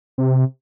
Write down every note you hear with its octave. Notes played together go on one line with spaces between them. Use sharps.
C3